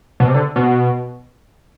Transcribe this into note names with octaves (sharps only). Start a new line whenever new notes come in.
B2
C3
D3
B2